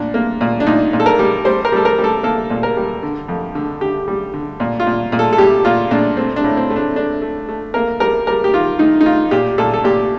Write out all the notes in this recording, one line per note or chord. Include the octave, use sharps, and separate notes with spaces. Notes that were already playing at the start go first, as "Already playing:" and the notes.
Already playing: A#2 D4
A#3
A#2
D4
A#2 D#4
A#2
A4
A#4
G3
G3 C5
A#4
G3 A4
A#4
G3
A4
A#3 A4
A#2
A#4
G3
D3
F2
D3
D3 G4
G3
D3
A#2
F4
A#2
A#2
A4
A4
G3 G4
A#2 F4
A#2 D4
A3 C4
D4
A2
C4
A3
D4
A3 D4
A3
A3
A#3 A#4
G3 A#4
G3 A#4
G4
D#3 F4
D#3 D#4
D#4
D#3 F4
A#2 G4
A#2 A4
A4
A#2 G4